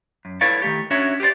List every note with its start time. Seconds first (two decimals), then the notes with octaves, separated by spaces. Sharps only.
0.25 F#2
0.41 E4 A4 B4 C#5 D5 F5
0.62 D#3 A3 G4
0.91 C#4 D4 F#4 C#5 E5
1.20 G4 G#4 B4 C5 D5